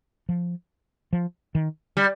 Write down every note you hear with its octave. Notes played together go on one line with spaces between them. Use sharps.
F3
F3
D#3
G3